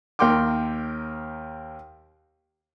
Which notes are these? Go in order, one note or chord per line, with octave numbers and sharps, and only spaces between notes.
D#2 A#4 G5 C6 D6